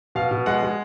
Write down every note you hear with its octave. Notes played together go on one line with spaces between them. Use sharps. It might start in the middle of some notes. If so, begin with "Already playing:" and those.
B2 F5
B2
G#3 F#5
G#3